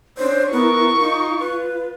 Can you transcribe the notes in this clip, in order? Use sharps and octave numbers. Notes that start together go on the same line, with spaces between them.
C#4 D4 C5
B3 E4 A#4 C#6
D#4 F4
B4